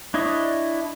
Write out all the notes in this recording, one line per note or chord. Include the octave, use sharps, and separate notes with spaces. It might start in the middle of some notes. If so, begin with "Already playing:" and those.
D4 E4 C#5 D#5